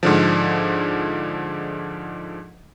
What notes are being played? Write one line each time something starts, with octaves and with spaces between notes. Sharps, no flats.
G#2 D3 F3